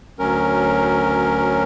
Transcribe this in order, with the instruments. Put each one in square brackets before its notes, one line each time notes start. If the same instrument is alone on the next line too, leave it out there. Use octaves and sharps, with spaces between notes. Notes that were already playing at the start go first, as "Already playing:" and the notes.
[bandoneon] D2 F#3 C#4 A#4